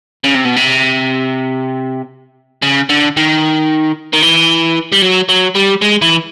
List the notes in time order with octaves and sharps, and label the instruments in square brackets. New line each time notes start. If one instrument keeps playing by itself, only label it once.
[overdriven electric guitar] C#3
C3
B2
C3
C#3
D3
D#3
D#3
E3
G3
F#3
F#3
G3
G#3
E3